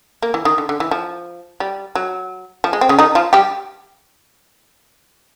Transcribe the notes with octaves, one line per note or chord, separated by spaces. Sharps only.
A#3
E3
D#3
D3
D3
E3
F3
G3
F#3
F3
G#3
C4
C#3 C#4
D#3 D#4
F3 F4
G3 G4